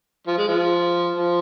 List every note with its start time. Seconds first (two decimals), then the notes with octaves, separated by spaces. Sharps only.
0.27 F3
0.38 G#3
0.48 F3
1.16 F3